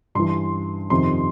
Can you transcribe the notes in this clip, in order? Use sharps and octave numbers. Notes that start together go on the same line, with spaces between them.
G2 E3 C6
F2 C3 D#3 C6